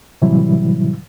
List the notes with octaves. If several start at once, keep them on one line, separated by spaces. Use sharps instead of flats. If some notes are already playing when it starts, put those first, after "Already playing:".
A2 C3 E3 F#3 G3 E4